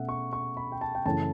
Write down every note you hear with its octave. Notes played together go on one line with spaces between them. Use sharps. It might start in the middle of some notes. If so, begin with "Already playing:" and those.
Already playing: B2 A3 C#4 E5 F#5
C#6
C#6
B5
G5
A5
G5
F#2 C#3 E3 A3 C#4 A5